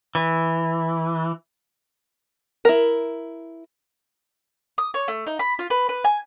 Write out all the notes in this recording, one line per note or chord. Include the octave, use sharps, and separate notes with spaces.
E3
E4 A#4
D#6
C#5
A3
D#4
B5
F4
B4
B4
G#5